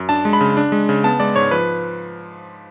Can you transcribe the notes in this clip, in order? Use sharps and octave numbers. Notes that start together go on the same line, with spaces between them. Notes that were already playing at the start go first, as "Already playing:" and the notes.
Already playing: F#2
D4 A5
G#3
B5
C#3
D4
G#3
C#3
B3 A5
G#3 D5
G#2 C#5
F3 B4